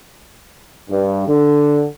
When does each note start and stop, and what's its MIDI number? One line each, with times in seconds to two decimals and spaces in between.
0.89 1.25 43
1.27 1.84 50